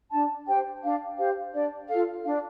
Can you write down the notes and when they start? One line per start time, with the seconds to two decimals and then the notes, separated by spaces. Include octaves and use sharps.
0.12 D4 A5
0.47 G4 C5 G5
0.82 D4 F5
1.18 G4 C5 F5
1.54 D4 D5
1.89 F4 A4 F5
2.25 D4 F5